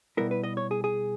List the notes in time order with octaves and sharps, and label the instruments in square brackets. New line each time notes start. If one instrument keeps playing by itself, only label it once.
[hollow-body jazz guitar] B2 G3 B3 E4 A#4
B4
D#5
C#5
G#4
G#4